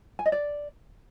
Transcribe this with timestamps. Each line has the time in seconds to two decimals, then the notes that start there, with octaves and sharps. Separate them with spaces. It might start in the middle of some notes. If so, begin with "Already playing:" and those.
0.19 G#5
0.26 D#5
0.32 D5